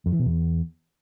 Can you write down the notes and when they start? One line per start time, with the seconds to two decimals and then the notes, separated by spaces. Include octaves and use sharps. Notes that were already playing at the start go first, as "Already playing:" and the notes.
0.06 F2
0.13 E3
0.19 B2
0.26 E2